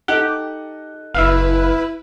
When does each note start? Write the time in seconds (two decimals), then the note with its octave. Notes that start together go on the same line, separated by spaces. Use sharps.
0.08 D#4 G4 A4 D#5 F#5
1.14 F#1 E4 B4 E5 F5